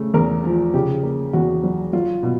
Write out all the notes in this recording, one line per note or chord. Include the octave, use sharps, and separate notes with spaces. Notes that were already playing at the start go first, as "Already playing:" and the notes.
Already playing: C#3 A3
E2 A#4
F3
C#3 G4
A#3
E2 F#4
F#3
F#3 F4
B2